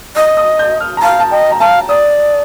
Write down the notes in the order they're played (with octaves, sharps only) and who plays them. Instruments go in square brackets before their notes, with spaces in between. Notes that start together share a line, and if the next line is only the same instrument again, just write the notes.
[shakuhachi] D#5 [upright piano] D#6
[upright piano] D#6
G6
F6
A#5
[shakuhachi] F5 [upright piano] A5
[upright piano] A5
[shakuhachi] D#5 [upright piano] G5
[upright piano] A#5
[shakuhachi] F5 [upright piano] A5
[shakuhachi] D5 [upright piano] D#6